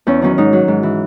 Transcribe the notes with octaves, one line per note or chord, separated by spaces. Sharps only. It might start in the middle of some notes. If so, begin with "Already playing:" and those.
E2 C#4
D#3 F#3 C#4
G#2 D#4
F#3
G#2
E3